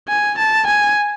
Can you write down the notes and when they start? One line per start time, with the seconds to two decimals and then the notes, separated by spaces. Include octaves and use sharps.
0.08 G#5
0.38 A5
0.67 G#5